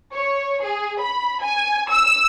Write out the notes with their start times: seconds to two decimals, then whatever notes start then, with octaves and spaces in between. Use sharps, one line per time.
0.13 C#5
0.63 G#4
1.01 B5
1.42 G#5
1.90 E6